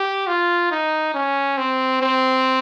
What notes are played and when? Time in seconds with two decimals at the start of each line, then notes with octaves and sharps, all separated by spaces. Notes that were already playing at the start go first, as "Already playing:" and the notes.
Already playing: G4
0.27 F4
0.71 D#4
1.14 C#4
1.57 C4
2.01 C4